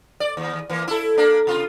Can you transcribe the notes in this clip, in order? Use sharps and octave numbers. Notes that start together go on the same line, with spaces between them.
D5
D#2
E3 A#3
E4 A4
A#3 D4
C3 F4